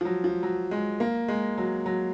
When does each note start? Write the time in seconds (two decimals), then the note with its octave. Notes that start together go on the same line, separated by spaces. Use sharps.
0.01 F3
0.05 F#3
0.24 F3
0.43 F#3
0.71 G#3
1.00 A#3
1.28 G#3
1.58 F#3
1.86 F#3